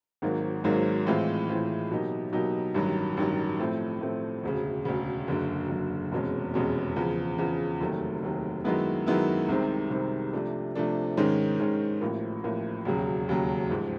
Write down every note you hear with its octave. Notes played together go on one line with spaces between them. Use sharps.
G#1 G#2 D#3 F#3 A#3
G#1 G#2 D#3 F#3 A#3
A2 E3 G#3 C4 F4
A2 E3 G#3 C4 F4
B2 F#3 A#3 D#4 G4
B2 F#3 A#3 D#4 G4
A1 G2 D#3 F#3
A1 G2 D#3 F#3
A2 F3 A3 C4
A2 F3 A3 C4
E1 D2 C#3
E1 D2 C#3
F#1 F#2 D3
F#1 F#2 D3
F1 E2 B2 G#3 C#4
F1 E2 B2 G#3 C#4
E2 C#3 F3
E2 C#3 F3
F1 D#2 D#3 F#3 A3
F1 D#2 D#3 F#3 A3
F#2 D#3 G#3 B3 E4
F#2 D#3 G#3 B3 E4
C2 C3 D#3 G#3 C4
C2 C3 D#3 G#3 C4
C3 F3 A3 D4
C3 F3 A3 D4
G#2 D#3 G#3 C#4
G#2 D#3 G#3 C#4
A1 A2 F3 A#3
A1 A2 F3 A#3
E1 D#2 C#3 F#3
E1 D#2 C#3 F#3
A1 G#2 F3